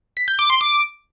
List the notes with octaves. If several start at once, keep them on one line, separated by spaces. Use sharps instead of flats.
B6
G6
D6
C6
D6